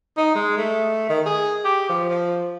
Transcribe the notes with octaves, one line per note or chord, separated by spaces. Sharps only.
D#4
G#3
A3
D#3
G#4
G4
F3
F3